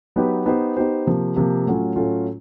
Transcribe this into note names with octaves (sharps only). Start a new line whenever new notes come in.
F#3 B3 D#4 G4 B4
B3 D#4 G4 C5
B3 D#4 G4 C5
C3 F3 A#3
C3 F3 A#3
A2 F#3 A3 C#4 F4
A2 F#3 A3 C#4 F4